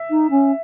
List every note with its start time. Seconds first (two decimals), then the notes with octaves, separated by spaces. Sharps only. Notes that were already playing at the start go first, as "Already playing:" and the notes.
Already playing: E5
0.10 D#4
0.30 C#4